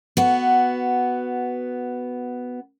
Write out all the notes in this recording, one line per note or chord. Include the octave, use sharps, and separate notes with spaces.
B3 F#4